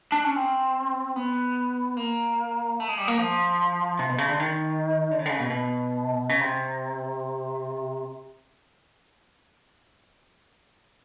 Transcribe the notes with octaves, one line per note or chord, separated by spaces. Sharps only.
D4
C#4
C4
B3
A#3
A3
G#3
G3
A#3
F3
C3
B2
C#3
D3
D#3
D3
C#3
D3
C#3
B2
B2
C#3
C3